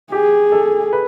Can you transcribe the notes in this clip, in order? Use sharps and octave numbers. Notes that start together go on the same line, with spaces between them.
G4 G#4
A4
B4